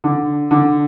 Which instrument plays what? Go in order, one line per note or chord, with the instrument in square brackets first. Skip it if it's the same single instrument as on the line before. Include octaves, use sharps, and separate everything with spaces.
[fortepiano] D3
D3